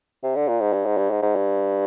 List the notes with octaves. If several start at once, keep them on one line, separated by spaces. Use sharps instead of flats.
C3
D3
A#2
G#2
G2
G#2
G2
G#2
G#2
G2